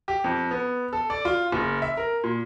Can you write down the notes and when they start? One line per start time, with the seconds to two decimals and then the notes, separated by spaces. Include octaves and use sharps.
0.08 G4
0.24 F2
0.51 B3
0.93 A4
1.10 D5
1.25 F4
1.52 F#1
1.82 E5
1.97 A#4
2.24 A#2